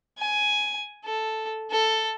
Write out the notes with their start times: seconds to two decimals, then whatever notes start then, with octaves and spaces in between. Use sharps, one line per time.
0.19 G#5
1.05 A4
1.71 A4